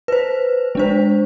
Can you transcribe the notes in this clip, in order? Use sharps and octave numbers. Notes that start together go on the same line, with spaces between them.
B4 C5
G#3 D4 C5